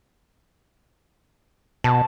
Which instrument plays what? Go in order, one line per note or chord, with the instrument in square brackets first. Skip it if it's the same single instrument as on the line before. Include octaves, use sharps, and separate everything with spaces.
[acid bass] B2 [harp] A5